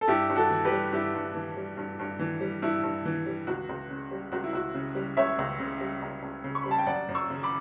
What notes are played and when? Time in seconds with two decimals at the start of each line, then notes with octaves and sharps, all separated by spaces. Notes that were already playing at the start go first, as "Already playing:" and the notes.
0.01 A4
0.08 G2 E4 G4
0.30 G2
0.36 F#4 A4
0.51 E3
0.65 G4 B4
0.71 G3
0.92 G2 E4 G4
1.14 G2
1.35 E3
1.57 G3
1.77 G2
1.99 G2
2.19 E3
2.41 G3
2.62 G2 E4
2.83 G2
3.05 E3
3.26 G3
3.47 C#2 F#4
3.69 C#2
3.90 C#3
4.11 G3
4.32 C#2 F#4
4.44 E4
4.53 C#2 F#4
4.74 C#3
4.95 G3
5.17 C#2 C#5 E5
5.39 C#2
5.60 C#3
5.81 G3
6.02 C#2
6.23 C#2
6.44 C#3
6.55 C#6
6.63 G3 B5
6.71 A5
6.78 G5
6.86 F#2 D5 F#5
7.08 F#2
7.15 C#6 E6
7.30 C#3
7.43 B5 D6